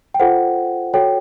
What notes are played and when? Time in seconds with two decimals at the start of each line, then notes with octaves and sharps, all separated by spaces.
0.14 G5
0.20 F4 A4 C5 F#5
0.94 F#4 A4 C#5 G5